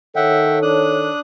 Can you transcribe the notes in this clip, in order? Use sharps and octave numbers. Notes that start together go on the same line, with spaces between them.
D#3 A4 C#5 E5 F#5 G5
D4 D#6 F#6